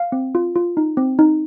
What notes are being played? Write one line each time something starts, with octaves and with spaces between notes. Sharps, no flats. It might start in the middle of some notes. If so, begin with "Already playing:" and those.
Already playing: F5
C4
F4
F4
D#4
C4
D#4